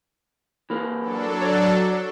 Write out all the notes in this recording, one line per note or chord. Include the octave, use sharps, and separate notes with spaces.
E3 A#3
F#3 D4 A4
C#5 D5